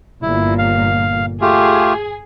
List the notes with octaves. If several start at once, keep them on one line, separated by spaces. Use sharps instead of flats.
G1 A#2 E4
F5
A3 F4 G4 G#4